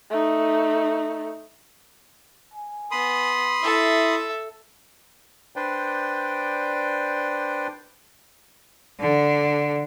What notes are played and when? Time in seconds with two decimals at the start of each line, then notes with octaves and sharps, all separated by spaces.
0.10 A3 D#4
2.54 G#5
2.91 B3 B5 C6 D#6
3.63 E4 A4 E5
5.56 D4 B4 C5 D5 G5
9.00 D3